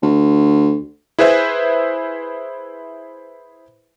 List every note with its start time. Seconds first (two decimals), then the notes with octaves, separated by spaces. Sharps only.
0.02 D2
1.19 E4 G#4 B4 C5 E5